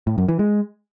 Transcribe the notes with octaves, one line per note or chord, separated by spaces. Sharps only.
A2
F#2
E3
G#3